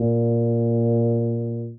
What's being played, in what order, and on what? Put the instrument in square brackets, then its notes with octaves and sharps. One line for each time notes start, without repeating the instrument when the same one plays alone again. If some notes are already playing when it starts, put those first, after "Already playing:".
Already playing: [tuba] A#2